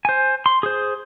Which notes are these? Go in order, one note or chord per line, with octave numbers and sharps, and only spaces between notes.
C5 G#5
C6
G#4 C5